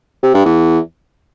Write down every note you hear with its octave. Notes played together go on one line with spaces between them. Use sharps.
C3
G2
E2